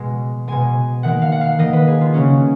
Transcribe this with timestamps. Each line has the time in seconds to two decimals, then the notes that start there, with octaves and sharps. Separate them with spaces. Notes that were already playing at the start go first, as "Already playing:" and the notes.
Already playing: B2 G#3
0.48 B2 G#3 G#5
1.03 D#3 A#3 F#5
1.22 F5
1.32 F#5
1.41 F5
1.59 D#3 A#3 D#5
1.73 B4
1.87 G#4
2.01 F4
2.14 C#3 F#3 A#3 C#4